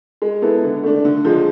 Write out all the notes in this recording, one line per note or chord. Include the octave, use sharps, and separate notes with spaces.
G#3
B3 E4 A4
D3
A3 D4
D3
F3 G#3